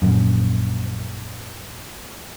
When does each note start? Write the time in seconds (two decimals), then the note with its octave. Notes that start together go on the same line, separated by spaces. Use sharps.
0.02 A#1 F#2